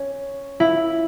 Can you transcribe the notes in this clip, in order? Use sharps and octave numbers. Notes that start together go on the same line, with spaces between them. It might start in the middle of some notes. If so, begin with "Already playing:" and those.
Already playing: C#4
E4